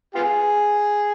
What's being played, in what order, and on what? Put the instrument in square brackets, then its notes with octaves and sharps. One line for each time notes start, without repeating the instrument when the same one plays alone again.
[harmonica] B3 F4 G#4